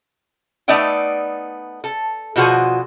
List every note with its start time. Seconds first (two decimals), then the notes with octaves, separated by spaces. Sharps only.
0.68 A3 B3 D#4 D5 E5 G5
1.84 A4
2.36 B2 D3 F3 F#4 G#4 C5